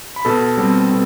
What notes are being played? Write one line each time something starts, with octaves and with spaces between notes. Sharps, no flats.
B5
B2 A4 A5
G3 C4
B2